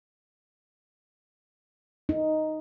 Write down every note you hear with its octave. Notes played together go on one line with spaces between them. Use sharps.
D#4